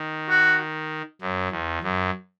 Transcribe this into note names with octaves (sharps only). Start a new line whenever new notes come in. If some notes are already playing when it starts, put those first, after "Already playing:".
Already playing: D#3
F#4
F#2
E2
F#2